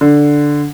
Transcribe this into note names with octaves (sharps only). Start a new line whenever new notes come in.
D3